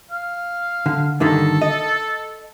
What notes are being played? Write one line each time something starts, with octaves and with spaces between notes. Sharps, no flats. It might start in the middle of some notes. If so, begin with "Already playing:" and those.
F5
D3
G2 D3 D#3 A4
D#5